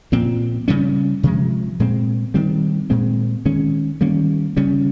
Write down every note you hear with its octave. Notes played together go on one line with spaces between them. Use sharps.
A#2 F3 C4
C#3 G3 C#4
C3 F3 G#3
A#2 G#3 C4
D#3 G3 C4
A#2 G#3 C4
D#3 G#3 C#4
D#3 G3 A#3 C#4
C#3 G3 C#4